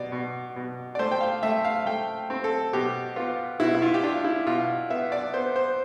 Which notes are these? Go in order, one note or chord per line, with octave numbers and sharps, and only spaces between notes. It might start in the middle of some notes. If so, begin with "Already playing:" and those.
Already playing: B2 D5
B2
B2
D5
A3 C5
G5
F5
A3 E5
F5
A3 G5
C4
A4
B2 G4
B3 F4
B2 E4
E4
F4
G4
D4 F4
E4
B2 F4
B3 E5
D5
B3 C5
C5